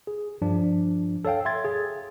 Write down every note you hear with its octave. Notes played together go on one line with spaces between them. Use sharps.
G#4
G2 F3 D4
A4 C#5 F5 G5
E5 C6 G#6 A6
G#4